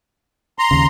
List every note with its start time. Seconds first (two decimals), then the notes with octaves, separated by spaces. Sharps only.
0.59 A#5 C6
0.71 D#2 C#3